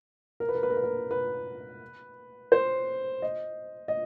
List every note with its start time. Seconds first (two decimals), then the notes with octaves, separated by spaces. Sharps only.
0.40 A#4
0.49 B4
0.55 A#4
0.63 B4
0.70 A#4
0.77 B4
0.83 A#4
1.11 B4
2.52 C5
3.22 D#5
3.88 D#5